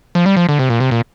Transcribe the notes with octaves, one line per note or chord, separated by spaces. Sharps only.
F3
G3
F3
D3
C3
A#2
C3
A#2